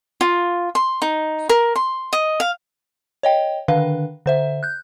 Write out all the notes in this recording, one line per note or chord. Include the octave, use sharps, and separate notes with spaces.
F4
C6
D#4
A#4
C6
D#5
F5
C#5 D#5 G5
D3 D#3 D4 B4 F5
D3 C5 E5
F#6 G6